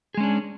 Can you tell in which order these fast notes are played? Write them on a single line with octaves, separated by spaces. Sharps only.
G#4 G#3 C#4 D4